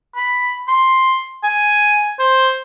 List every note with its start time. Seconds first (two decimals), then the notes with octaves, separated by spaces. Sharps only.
0.16 B5
0.68 C6
1.43 G#5
2.19 C5